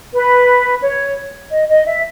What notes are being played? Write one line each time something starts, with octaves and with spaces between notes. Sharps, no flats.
B4
C#5
D#5
D#5
E5